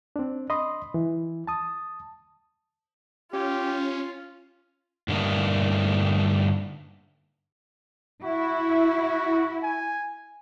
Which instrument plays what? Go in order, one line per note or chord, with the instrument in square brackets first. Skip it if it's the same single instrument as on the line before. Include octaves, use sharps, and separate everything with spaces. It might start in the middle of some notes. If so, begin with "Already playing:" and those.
[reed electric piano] C4 D4
D#5 B5 C6 D#6
E3
A5 D#6
[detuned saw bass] C#4 [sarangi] F4 [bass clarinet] G4
[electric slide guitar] G2 D3 A3 A#3 D#4
[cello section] E4 [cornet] F#4
[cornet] G#5